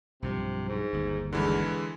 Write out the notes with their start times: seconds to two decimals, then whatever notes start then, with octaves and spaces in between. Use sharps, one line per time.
0.22 B1 G2 C3 F3
0.69 G#2
0.92 G1 D#2
1.33 E2 D3 E3 G#3